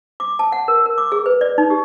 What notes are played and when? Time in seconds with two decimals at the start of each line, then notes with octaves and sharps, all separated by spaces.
0.20 D6
0.39 A5
0.52 F#5
0.68 A#4
0.86 A#4
0.98 D6
1.12 G#4
1.26 B4
1.41 D5
1.58 D#4
1.70 G4